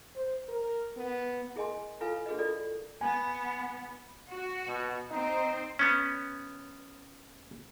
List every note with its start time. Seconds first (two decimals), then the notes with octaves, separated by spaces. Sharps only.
0.16 C5
0.48 A#4
0.97 B3
1.56 E4 G#4 A#4 D#5 G#5 C6
2.00 E4 F4 A4 B4 F5 G#5
2.26 D4 F#4 G#4 A#4 B4 D#5
2.39 E4 F4 A4 A#4 D5
3.01 B3 G#5
4.30 F#4
4.67 B2
5.11 C4 D#4 C5
5.79 B3 C#4